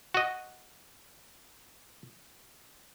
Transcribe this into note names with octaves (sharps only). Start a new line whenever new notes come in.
F#4 D#5